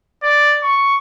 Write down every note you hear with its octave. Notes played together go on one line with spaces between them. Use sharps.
D5
C#6